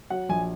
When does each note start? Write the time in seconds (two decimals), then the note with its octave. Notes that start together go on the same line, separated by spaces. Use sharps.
0.10 F#3 F#5
0.29 A#1 G#5